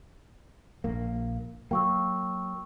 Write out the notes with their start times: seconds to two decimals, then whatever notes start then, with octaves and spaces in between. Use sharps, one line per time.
0.84 A#1 A#3
1.71 F#3 A#3 G5 C#6 E6